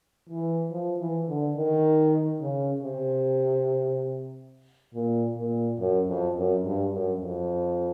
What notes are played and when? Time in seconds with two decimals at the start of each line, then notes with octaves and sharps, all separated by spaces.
0.29 E3
0.71 F3
0.99 E3
1.28 D3
1.56 D#3
2.40 C#3
2.82 C3
4.94 A#2
5.37 A#2
5.79 F#2
6.08 F2
6.36 F#2
6.64 G2
6.93 F#2
7.21 F2